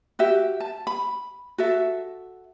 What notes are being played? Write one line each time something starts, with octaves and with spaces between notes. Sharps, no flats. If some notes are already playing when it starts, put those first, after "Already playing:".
F#4 G4 E5
A5
B5
F#4 A4 E5